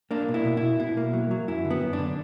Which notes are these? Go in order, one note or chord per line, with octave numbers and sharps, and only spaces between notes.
A#3 D4
B2
E4
B2
E4
B2
B2 E4
A#3
F#3
F#3
F#2 E4
D3
B3
F#2
D4
D3